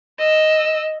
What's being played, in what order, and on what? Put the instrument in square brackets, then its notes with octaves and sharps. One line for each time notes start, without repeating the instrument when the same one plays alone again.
[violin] D#5 E6